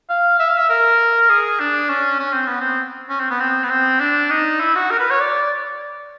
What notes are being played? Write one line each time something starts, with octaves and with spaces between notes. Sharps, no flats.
F5
E5
F5
E5
A#4
G#4
D4
C#4
C#4
C4
B3
C4
C#4
C4
B3
C4
B3
C4
D4
D#4
E4
F#4
A#4
B4
C#5
D5